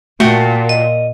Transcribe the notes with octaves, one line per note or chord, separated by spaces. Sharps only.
A#2 A3 F#4 G5 A5
D#5